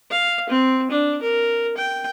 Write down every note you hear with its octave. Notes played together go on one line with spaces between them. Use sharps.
F5
C4
D4
A#4
G5